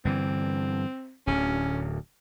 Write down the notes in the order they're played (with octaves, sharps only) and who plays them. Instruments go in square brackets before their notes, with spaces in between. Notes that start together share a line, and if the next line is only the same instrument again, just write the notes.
[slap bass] G2 D3 E3 [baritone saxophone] C4
[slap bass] D1 D2 [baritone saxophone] C#4